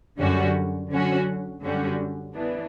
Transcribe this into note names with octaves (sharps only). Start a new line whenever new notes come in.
F#2 D3 G3 C#4 F#4
D3 F#3 C#4 F#4
F#2 D3 G3 C#4 F#4
E3 B3 D4